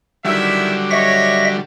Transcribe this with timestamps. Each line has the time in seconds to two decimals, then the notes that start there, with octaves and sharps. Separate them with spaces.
0.25 D3 D#3 F#3 G3 E4 E5
0.90 C#5 D#5 E5 A#6